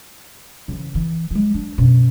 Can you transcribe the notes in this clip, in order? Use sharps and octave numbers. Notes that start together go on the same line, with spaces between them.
C#3 E3
E3
F#3 G#3
D4
F#2 B2